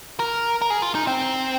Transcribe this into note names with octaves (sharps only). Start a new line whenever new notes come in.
A#4
A#4
G#4
F4
D#4
C4